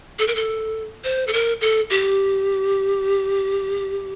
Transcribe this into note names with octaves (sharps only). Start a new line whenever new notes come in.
A4
A#4
A4
C5
A4
A#4
A4
G4